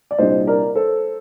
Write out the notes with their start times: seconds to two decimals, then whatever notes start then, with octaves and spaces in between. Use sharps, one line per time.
0.11 D5
0.18 C2 A#2 G3 D4 C5 D#5
0.47 A#4 D5
0.75 A4 C5